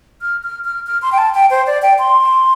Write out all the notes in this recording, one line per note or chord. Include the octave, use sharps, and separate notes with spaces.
F6
F6
F6
F6
C6
G5
A5
G5
C5
D5
G5
C6